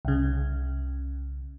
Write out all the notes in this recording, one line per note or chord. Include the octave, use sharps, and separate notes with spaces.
C2 C#3